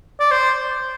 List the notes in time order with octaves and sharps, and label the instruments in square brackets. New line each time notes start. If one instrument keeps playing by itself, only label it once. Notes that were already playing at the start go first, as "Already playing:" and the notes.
[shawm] D5
C5